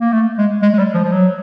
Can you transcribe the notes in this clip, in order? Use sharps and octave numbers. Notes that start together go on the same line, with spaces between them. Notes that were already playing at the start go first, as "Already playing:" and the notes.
A#3
A3
G#3
G#3
G#3
G3
F3
F3
F#3